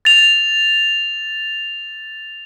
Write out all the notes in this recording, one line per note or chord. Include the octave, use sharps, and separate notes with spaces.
A6 F7